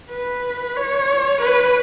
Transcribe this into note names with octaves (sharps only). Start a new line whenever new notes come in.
B4
C#5
B4